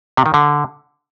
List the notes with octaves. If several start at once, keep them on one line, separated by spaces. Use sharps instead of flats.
C3
D#3
D3